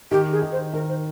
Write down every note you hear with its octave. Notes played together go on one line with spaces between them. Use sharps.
D#3 G4
G#4
D#3
C5
D#3 A#4
C5